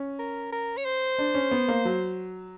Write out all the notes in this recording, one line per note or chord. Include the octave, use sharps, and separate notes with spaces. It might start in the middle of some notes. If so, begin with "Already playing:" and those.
Already playing: C#4
A#4
A#4
C#5
C5
D4
C#4
B3
A#3
F#3